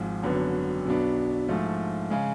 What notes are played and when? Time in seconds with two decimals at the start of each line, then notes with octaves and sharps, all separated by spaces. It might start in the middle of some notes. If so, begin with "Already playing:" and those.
Already playing: G#1 G#2 F3
0.23 G#1 F#2 D3 F#3 B3
0.85 B1 B2 F#3 B3 D4
1.48 G#2 F3 A3
2.10 C#3 G#3